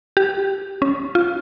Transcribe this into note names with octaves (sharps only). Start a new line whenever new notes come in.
G4
C#4
F4